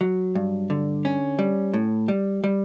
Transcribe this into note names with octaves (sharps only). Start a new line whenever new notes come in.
F#3
G2
D3
C#4
G3
A2
G3
G3